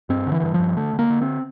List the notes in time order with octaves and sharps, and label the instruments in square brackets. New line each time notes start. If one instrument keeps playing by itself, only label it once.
[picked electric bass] G2 C4
D3
E3
G2
F3
G2
D3 A3
D3
A#3
D3
C4